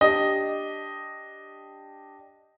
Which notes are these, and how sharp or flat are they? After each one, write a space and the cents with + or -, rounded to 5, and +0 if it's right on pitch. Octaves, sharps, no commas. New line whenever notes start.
D4 +0 G4 +0 D#5 +0